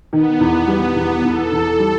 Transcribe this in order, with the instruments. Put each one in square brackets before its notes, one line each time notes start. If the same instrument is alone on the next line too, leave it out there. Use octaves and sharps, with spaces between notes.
[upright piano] D#3 [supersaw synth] B3
[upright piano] E2
G3
E2
[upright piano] E2 [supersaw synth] A4
[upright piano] E2
G3